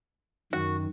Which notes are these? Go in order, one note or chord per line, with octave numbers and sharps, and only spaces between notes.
F#2 D#3 F#4